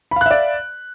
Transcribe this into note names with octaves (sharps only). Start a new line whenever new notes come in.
D5 E5 F5 B5 F#6